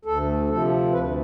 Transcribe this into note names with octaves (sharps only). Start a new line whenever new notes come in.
D2 A4
C3 F3 A4
D2 B4